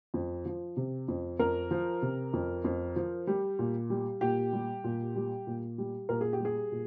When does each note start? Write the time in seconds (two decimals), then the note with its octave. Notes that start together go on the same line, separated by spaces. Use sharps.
0.14 F2
0.45 F3
0.77 C3
1.08 F2
1.39 F2 A#4
1.71 F3
2.02 C3
2.33 F2
2.64 F2
2.96 F3
3.27 G3
3.59 A#2
3.90 G3
4.21 A#2 G4
4.53 G3
4.84 A#2
5.15 G3
5.47 A#2
5.78 G3
6.09 A#2 A#4
6.21 G#4
6.33 G4
6.40 G3 G#4
6.72 A#2